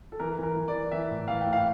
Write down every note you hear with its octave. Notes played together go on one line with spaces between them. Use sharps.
A4
E3 A#4
E3 A#4
E3
D5
E3
E3 E5
A2
E3 F5
G5
A2
F5